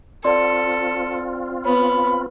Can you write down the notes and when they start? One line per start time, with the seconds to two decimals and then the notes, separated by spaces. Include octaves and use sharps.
0.24 C4 F4 A4 D5 C6
1.65 B3 C#5 B5